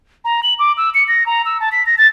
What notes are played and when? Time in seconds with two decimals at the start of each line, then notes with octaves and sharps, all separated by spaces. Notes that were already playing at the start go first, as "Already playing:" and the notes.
0.25 A#5
0.43 F#7
0.59 D6
0.77 E6
0.95 C#7
1.08 A#6
1.26 A#5
1.46 E6
1.60 A5
1.72 B6
1.86 A#6
1.98 A6